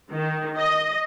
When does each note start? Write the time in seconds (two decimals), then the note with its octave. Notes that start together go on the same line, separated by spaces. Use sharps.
0.11 D#3
0.58 D#5